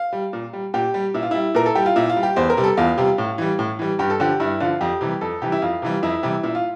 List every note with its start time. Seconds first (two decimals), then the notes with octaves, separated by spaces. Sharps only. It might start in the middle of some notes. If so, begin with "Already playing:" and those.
Already playing: F5
0.13 G3
0.33 A#2
0.53 G3
0.74 A#2 G4
0.94 G3
1.14 A#2 E4
1.23 F4
1.31 G3 E4
1.55 A#2 A#4
1.66 A4
1.75 G3 G4
1.86 F4
1.96 A#2 E4
2.10 F4
2.16 G3
2.23 G4
2.36 E2 C5
2.50 A#4
2.57 C3 G3
2.64 A4
2.77 E2 F4
2.98 C3 G3
3.18 A2
3.38 E3 G3
3.59 A2
3.79 E3 G3
3.99 G2 G4
4.10 A4
4.20 D3 F3 G4
4.40 G2 E4
4.60 D3 F3 F4
4.81 F2 G4
5.01 C3 E3 G3
5.21 F2 A4
5.42 C3 E3 G3 G4
5.52 E4
5.62 F2 F4
5.82 C3 E3 G3
6.03 F2 E4
6.23 C3 E3 G3
6.43 A#2 E4
6.55 F4